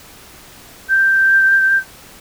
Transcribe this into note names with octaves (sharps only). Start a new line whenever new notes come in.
G6